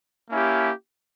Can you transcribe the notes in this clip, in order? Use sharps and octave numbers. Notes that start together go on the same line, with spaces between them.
A#3 C#4 E4 G4